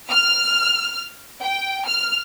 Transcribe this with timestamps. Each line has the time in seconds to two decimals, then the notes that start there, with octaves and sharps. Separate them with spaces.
0.11 F6
1.43 G5
1.86 F6